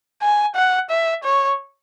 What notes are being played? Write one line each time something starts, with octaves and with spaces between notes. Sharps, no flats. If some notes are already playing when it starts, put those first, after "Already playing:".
G#5
F#5
E5
C#5